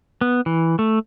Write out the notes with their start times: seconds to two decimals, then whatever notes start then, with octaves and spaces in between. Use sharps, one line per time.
0.21 B3
0.46 E3
0.79 A3